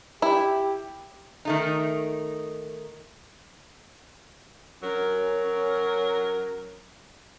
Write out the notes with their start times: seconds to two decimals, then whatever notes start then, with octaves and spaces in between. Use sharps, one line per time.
0.22 E4 G4
1.45 D#3 A3 D#4
4.83 F#3 C#4 A#4